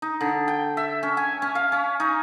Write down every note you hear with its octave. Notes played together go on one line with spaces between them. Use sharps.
D#4
D3
G5
E5
C#4
G#5
C#4
F5
C#4
D#4